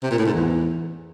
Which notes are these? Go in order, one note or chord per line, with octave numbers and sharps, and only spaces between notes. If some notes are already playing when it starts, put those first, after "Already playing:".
C3
A#2
A2
G#2
E2